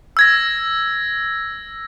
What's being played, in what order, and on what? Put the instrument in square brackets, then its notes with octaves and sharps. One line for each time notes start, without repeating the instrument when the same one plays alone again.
[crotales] E6 G#6 A#6